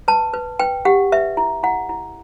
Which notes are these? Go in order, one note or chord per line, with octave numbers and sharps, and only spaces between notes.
B4 A5
B4
B4 G5
G4 F#5
B4 E5
E4
E4 F#5
E4